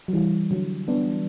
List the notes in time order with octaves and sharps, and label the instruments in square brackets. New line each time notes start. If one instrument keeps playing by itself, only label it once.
[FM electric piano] F#3
E3 G3
D3 F#3
B3 D4